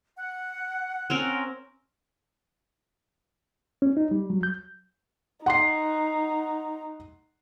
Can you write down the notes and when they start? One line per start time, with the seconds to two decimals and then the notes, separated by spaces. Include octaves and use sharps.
0.17 F#5
1.10 C4 C#4 A#4
3.82 C#4
3.97 D#4
4.11 G3
4.30 F#3
4.43 G6
5.46 D#4 F#5 C6 C7